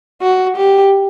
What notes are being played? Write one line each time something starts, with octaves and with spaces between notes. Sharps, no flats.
F#4
G4